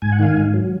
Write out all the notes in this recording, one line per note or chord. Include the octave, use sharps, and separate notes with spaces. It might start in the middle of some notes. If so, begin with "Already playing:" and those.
G#2 G#5
F#5
D#3 F5 G#5
G#2
F#3